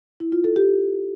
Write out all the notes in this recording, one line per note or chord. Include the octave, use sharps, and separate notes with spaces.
E4
F4
A4
G4